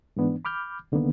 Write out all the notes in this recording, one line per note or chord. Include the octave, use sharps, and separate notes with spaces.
G#2 E3 B3 D4
B5 D6 F6 G6
C2 D3 D#3 A#3 B3